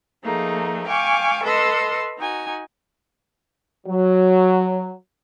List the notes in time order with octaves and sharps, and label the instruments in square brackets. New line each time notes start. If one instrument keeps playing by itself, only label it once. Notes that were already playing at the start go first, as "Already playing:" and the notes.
[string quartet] F3 A3 A#3 D#4 G#4
F5 G5 G#5 C#6 D6
A4 B4 D#5 C6 E6
D#4 F#4 G#5
[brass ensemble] F#3